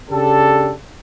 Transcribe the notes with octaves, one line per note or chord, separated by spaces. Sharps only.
C#3 D4 G4 A4